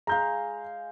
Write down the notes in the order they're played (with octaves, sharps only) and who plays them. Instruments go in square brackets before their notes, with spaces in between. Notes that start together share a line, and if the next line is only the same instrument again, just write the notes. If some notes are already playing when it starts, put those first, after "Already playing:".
[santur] G#3 F5 [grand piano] A#5 G6